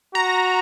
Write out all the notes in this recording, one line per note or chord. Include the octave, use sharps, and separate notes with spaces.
F#4 A#5